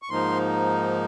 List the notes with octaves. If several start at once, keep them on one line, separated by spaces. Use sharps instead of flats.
C#6
G#2 F3 A#3 D#4 C6